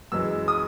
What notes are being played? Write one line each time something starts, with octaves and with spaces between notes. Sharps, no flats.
F#2 E3 G#3 E6
D#6